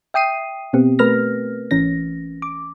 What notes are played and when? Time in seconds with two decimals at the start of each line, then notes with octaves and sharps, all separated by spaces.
0.14 E5 G5 D#6 C7 D#7
0.73 B2 B3 C4 G4
0.99 A3 A#4 B4 F6 A#6
1.71 G#1 E3 C#4 A#6
2.42 D6